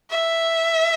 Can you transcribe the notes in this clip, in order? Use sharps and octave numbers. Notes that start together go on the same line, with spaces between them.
E5